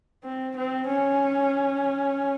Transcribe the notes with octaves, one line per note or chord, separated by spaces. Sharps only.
C4
C4
C#4